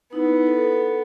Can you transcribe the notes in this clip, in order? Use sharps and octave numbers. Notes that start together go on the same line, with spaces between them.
B3 D#4 E4
A4